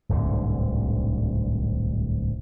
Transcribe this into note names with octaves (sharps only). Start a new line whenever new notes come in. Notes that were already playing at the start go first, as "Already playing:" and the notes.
D1 C2 G#2 D3